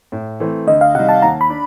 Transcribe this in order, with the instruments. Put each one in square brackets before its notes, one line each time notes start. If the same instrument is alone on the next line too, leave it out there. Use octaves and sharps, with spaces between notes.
[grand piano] A2
E3 A3 C4
[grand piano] D2 [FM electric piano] D#5
[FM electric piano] F5
[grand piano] C3 D#3 G3 [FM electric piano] F#5
[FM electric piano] A5
[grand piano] D#2 [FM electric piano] A#5
[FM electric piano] B5
[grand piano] D4